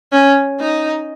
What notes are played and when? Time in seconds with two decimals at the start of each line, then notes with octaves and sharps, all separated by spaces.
0.12 C#4
0.60 D#4